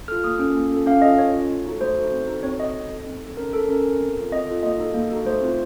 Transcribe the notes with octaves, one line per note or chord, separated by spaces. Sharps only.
F4 A4 F6
A#3 D#6
C#4 F4 A4
A#3
C#4 F4 A4
C#4 F5
F4 A4 D#5
C#4 C#5
F4 A4
A3
D#4 F#4 A4
A3 C5
D#4 F#4 A4
C4
D#4 F#4 A4
C4 C#5
D#4 F#4 A4 D#5
C4
D#4 A4
C4
D#4 A4
C#4 A#4
A4
C#4 A#4
A4
C4
F4 A4
C4 D#5
F4 A4
A#3 D#5
D#4 F#4 A4
A#3
D#4 F#4 A4
A3 C5
C4 F4